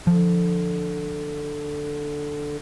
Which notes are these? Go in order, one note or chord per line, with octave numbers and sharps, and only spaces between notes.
D3 F3